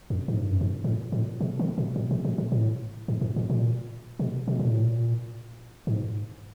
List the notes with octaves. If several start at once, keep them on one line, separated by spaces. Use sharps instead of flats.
F2
G#2
G2
F#2
G2
A2
A2
B2
D3
A#2
A2
A#2
A#2
A#2
A2
G#2
G2
A2
A#2
B2
B2
A#2
A2
A#2
G#2